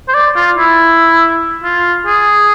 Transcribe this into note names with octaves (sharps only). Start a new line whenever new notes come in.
C5
D5
F4
E4
F4
G#4